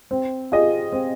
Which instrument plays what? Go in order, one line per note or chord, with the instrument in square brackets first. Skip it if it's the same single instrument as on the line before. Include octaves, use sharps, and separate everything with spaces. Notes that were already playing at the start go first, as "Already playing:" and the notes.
[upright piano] C4
F4 G#4 D#5
C4